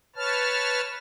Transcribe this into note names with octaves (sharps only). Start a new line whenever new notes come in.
B4 C#5 A5 F6